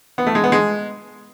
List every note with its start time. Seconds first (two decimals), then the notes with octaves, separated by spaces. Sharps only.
0.18 B3
0.27 A3
0.35 G#3
0.44 B3
0.52 G#3